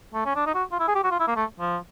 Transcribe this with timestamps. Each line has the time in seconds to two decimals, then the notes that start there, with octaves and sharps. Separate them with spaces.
0.14 A3
0.25 C#4
0.36 D4
0.46 D#4
0.54 F#4
0.72 F4
0.79 E4
0.88 G#4
0.95 G4
1.04 F#4
1.11 F4
1.20 E4
1.28 A#3
1.36 A3
1.60 F3